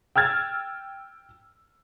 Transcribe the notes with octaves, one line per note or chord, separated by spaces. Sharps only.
G5 E6 F6 G#6 A6